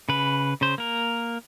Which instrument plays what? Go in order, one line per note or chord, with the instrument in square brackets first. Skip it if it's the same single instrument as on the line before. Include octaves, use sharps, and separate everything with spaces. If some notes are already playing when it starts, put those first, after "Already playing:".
[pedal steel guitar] C#3 B4
C#3 C5
A#3 A#4